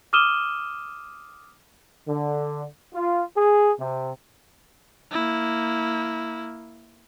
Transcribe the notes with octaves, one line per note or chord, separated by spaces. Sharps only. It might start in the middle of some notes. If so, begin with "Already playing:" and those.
D6 D#6 F6 D#7 E7 G7
D3
F4
G#4
C3
A#3 E4